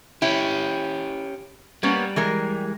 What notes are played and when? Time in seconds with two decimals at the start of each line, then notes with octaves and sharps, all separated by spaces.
0.22 C#4 E4 G4
1.83 G3 A#3 B3 C#4
2.16 E3 G#3 A#4